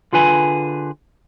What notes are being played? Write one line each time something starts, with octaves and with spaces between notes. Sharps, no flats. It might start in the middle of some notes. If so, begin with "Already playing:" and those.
D3 F4 G#4 B4 G#5 B5